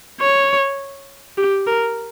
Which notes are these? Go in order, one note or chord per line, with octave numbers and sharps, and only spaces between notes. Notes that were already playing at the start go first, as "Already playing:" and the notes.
C#5
G4
A#4